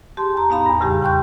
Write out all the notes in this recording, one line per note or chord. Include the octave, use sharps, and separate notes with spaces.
G4 G#4 A5 C6
E2 A#5
A2 B3 D#4 F5 B5
E2 G2
F2 A2 C#3 G3 G4 G#4
G5 C6 C#6 F#6 G6